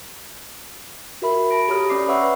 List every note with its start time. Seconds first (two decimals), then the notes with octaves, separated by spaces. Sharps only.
1.22 F#4 A#4 E5 B5
1.50 A5 B5 A#6 D7
1.68 G4 A4 C#5 A#5 D#6 F6
1.89 C#4 D5 B5 D6 C7
2.08 B4 C#5 E5 F#5 C#6 E6